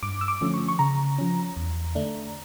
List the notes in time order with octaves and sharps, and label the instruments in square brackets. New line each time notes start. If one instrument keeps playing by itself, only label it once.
[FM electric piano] G2 D6
E6
D6
D3 F3 A3 C#4
C#6
C#6
C#3 A#5
F3 C#4
E2
D3 A3 D4